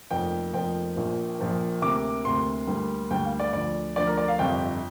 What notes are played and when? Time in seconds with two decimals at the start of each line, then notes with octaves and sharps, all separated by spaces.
0.10 F1 F2 F3 A#3 G5
0.53 F1 F2 F3 A#3 G5
0.96 A#1 A#2 F3 A#3
1.39 A#1 A#2 F3 A#3
1.82 D2 C3 A#3 D6
2.25 D2 C3 A#3 C6
2.67 D2 D3 G3 A#3
3.11 D2 D3 G3 A#3 G5
3.25 F5
3.40 D5
3.53 D2 D3 F3 D5
3.96 D2 D3 F3 D5
4.07 A#4
4.17 D5
4.28 F5
4.39 G1 F2 C3 G5